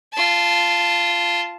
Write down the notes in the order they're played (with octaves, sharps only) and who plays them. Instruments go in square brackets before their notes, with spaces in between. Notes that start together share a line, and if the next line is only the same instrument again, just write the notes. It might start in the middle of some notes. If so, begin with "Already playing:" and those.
[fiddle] F4 A5